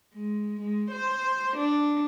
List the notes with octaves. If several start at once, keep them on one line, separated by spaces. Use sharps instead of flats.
G#3
G#3
C5
D4